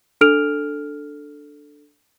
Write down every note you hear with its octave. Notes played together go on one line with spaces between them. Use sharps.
D4 A4 F6 D7 F7